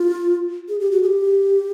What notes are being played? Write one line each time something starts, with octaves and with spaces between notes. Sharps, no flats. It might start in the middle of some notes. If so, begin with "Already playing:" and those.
Already playing: F4
G#4
G4
F#4
G#4
G4